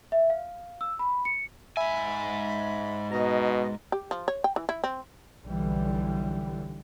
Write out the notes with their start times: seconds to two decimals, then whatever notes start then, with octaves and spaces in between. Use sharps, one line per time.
0.12 E5
0.30 F5
0.81 E6
0.99 B5
1.25 C#7
1.77 G#2 E5 G#5 B5
3.12 B2 D#5 A#5
3.92 G4
4.11 F3
4.28 C#5
4.44 G5
4.56 E3
4.69 E4
4.84 C4
5.44 B1 D3 E3 G3